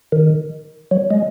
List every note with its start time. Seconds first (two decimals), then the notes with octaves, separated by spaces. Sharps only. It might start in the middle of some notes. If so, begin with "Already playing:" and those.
0.12 D#3
0.91 F#3
1.11 G#3